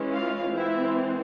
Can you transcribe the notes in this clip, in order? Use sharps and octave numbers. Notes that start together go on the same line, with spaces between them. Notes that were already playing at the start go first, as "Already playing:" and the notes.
Already playing: E3 G#3 C#4
F4 F5
E3 G#3 C4 E4 E5